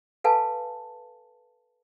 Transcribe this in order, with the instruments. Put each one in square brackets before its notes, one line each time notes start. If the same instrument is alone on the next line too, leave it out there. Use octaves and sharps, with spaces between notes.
[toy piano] A4 B4 F5 G#5 A5